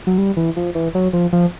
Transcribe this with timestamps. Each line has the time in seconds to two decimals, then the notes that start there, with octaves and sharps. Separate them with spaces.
0.07 F#3
0.18 G3
0.37 E3
0.57 F3
0.75 E3
0.95 F#3
1.13 F3
1.33 F3